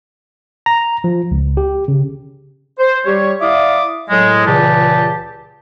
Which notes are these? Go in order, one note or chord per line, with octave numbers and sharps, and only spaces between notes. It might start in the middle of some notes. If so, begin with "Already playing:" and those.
A#5
F3
C#2
G4
C#3
C5
G3 G4 C#5
E4 D5 E5 F5 D6 D#6
A2 F#3 G#3
C#2 A#2 C#3 E3 G4 A5